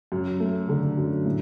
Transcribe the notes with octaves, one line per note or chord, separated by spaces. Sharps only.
F#2
A3
D3
F#2
A2